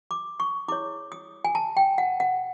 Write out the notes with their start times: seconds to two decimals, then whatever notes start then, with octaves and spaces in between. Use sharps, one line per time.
0.11 D6
0.40 C#6
0.68 E4 G#4 C#5 D6
1.12 D#6
1.45 G#5
1.55 A5
1.77 G5
1.98 F#5
2.20 F#5